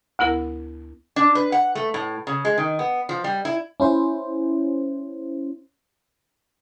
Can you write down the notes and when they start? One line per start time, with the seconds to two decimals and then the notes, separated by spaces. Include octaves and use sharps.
0.19 D2 B3 E4 A#4
1.16 D4
1.35 B4
1.52 F#5
1.75 A3
1.94 A2
2.27 C#3
2.45 G#3
2.58 D#3
2.79 B3
3.09 F3
3.24 G3
3.45 E4
3.80 C#4 E4 C5